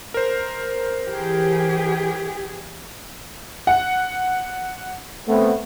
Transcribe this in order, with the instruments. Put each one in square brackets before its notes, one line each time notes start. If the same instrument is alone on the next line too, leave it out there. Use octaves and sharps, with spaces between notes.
[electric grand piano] A#4 C5
[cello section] E3 G4 G#4
[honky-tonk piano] F#5
[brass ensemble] A3 B3 C4